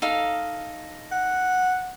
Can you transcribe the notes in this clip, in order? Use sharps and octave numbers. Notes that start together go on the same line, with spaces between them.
D#4 A4 F5
F#5